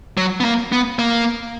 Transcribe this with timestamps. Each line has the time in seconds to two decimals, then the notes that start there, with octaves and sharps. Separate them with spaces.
0.17 F#3
0.40 B3
0.45 A#3
0.72 B3
0.99 A#3